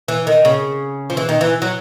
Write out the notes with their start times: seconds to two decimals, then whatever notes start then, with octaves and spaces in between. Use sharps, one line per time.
0.08 E3
0.27 D#3
0.45 C#3
1.10 F3
1.17 E3
1.29 D#3
1.41 E3
1.62 F#3